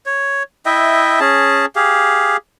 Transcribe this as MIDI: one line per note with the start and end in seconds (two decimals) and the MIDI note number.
0.06 0.43 73
0.66 1.20 64
0.66 1.20 75
0.66 1.20 76
0.66 1.20 79
1.20 1.66 61
1.20 1.66 68
1.20 1.66 81
1.76 2.37 67
1.76 2.37 68
1.76 2.37 77